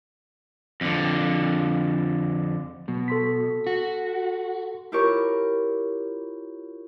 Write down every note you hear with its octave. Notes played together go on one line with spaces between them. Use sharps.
F2 D3
B2 F#3
A4 C6 B6
F#4
E4 F4 G4 A#4 C#5 C#6